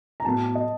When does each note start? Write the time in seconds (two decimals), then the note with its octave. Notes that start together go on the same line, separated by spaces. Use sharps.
0.20 A#5
0.25 A2 F#3 B3 A5
0.55 D#5